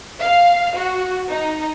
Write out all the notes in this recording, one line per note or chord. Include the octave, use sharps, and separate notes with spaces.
F5
F#4
D#4